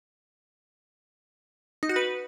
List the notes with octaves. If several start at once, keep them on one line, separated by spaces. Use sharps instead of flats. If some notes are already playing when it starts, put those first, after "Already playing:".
D#4
F#4
B4